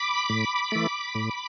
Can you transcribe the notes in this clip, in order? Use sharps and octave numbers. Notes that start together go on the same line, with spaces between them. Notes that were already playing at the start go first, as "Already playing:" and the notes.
Already playing: B5 D6
A2
E3 A3
A2